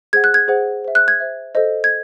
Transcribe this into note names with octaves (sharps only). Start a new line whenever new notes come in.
G#4 C5 F#5 G#6
F#6
G#6
G#4 C5 F#5
C5 E5
F#6
G#6
C5 E5
A4 C5 D#5
G#6